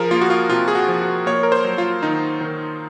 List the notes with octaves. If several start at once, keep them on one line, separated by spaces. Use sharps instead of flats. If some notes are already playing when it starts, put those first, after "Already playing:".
Already playing: F3 G#4 A#4
A#3 F4
F#4
F4
C3 F4
G#4
F#4
F3
F#4
A#3 C#5
A#4
C5
F#3
F4
D#3 D#4
D#3